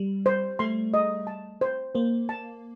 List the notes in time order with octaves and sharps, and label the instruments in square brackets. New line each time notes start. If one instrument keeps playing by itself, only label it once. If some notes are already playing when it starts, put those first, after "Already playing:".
Already playing: [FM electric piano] G3
[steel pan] C5
[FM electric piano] A3 [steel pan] C6
[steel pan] D#5
A5
C5
[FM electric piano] A#3 [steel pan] C5
[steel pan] A5